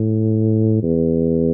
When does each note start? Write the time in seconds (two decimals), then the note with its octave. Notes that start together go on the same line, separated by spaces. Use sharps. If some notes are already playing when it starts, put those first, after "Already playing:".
Already playing: A2
0.83 E2